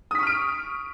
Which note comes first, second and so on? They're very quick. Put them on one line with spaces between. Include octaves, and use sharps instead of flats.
D#6 B6 C#6 F6 D7